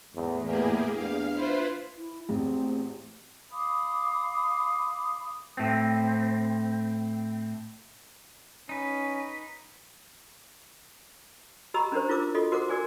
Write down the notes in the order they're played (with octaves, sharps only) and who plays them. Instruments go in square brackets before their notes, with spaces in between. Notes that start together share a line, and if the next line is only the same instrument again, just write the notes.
[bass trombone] E2 [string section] A2
[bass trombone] E2 [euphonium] E3 [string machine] A#3 G4 G#4
[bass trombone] E2 [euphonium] D4 [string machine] F5
[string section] E4 C5 [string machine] F4 B4
[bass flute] E4
[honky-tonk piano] A1 E2 [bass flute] C4
[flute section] F5 B5 D6 D#6
[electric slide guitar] A2 C4
[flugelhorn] C#4 [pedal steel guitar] D#4 B4
[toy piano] F#4 G4 D#5 A#5 B5 E6
C#4 D4 G4 A#4 C5
E4 F4 A#4 D6 E6
F4 F#4 A4 D#5
F#4 A#4 C5 F#5 D6
F#4 A#4 D5 G#5 D6